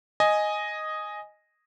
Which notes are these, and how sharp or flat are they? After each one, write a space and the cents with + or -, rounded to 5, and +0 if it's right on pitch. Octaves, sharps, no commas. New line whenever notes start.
D#5 +0 G#5 +0